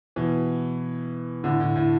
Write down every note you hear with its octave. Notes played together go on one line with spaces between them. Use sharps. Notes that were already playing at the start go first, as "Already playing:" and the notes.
B2 E3
A2 D3
A2
A2